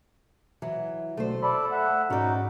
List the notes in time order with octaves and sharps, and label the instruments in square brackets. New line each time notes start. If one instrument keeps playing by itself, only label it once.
[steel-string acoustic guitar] E3 F#3
[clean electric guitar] B1 [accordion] D3 [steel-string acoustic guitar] A3 C5
[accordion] A4 D5 [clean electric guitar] B5
[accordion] E5 F#5
[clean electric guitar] G#2 [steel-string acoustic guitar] C#4 D5 [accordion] D#4 F#4